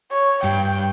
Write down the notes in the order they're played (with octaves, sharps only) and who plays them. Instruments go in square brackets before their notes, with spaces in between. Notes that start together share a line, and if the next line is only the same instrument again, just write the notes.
[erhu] C#5
[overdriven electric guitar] G2 [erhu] G5